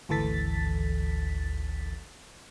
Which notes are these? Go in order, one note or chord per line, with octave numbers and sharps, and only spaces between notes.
G#1 D2 E3 A4 A6 B6